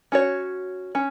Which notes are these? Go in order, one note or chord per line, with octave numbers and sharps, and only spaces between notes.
C#4 F#4 C#5
C#4